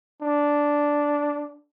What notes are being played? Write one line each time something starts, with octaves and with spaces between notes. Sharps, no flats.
D4